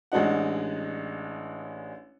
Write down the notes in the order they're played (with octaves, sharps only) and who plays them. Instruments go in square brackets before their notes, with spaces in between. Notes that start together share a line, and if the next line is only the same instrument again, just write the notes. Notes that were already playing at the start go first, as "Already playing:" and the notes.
[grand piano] A1 G#3 D4 D#4 F#5